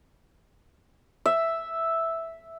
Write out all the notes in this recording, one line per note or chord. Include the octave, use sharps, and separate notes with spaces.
E5